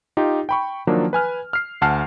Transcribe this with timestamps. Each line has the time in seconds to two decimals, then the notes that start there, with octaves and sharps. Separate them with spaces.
0.17 D#4 F4 G4
0.49 G5 B5 C#6
0.87 D#3 F3 F#3 A#3 D4
1.13 B4 G#5 F6
1.53 F6 C7
1.81 D2 F#5 A5 F6 C7